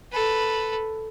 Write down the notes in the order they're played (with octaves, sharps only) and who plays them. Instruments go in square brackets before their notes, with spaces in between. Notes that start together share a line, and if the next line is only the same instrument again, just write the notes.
[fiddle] A4 B4